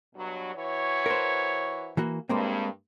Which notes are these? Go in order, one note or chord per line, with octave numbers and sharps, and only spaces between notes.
G2 B2 F#3
E3 F#4 C#5
A#4 C5
E3 A#3 F#4
G2 G#3 A#3 C4